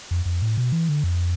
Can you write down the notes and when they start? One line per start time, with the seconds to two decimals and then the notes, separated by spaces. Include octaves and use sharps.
0.11 F2
0.25 F2
0.42 A2
0.57 B2
0.72 E3
0.89 D3
1.04 F2